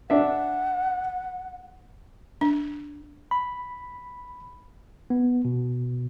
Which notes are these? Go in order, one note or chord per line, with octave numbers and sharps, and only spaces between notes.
D4 E5 F#5
D4
B5
B3
B2